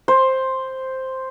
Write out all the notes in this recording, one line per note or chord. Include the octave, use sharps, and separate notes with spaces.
C5